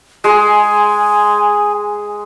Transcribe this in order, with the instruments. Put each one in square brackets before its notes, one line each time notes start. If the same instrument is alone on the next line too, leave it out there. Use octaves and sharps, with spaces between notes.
[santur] G#3 [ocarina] G#5